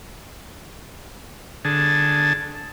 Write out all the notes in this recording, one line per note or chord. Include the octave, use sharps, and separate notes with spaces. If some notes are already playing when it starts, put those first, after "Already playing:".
D3 G#4 A5